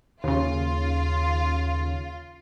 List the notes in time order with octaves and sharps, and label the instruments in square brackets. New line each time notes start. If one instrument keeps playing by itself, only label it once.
[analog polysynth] D#2 C#3 [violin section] F4